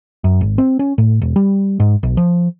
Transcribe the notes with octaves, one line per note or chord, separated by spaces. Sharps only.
F#2
G#1
C4
C#4
A2
E1
G3
G#2
B1
F3